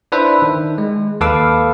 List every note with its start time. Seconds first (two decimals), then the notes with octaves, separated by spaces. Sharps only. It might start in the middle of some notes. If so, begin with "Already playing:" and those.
0.12 D4 E4 B4 C5 E5
0.42 D#3
0.78 G#3
1.21 D#2 A4 B4 F5 D6 E6